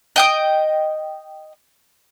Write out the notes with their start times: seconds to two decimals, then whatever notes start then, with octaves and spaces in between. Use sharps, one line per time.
0.16 D#5 G5 D#6